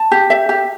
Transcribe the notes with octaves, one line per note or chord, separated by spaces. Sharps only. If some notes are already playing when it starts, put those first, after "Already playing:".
Already playing: A5
G4
E5
G4